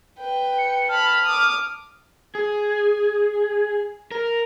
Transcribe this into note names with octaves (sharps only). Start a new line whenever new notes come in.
B4 G5
C#7
A5 B5 F6
D6 D#6
G#4
A#4